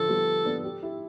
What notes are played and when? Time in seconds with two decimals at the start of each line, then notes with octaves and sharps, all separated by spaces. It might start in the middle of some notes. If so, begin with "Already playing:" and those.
Already playing: D3 F3 A4
0.09 G3 B3
0.45 B3 D4
0.64 G4
0.83 E4 G4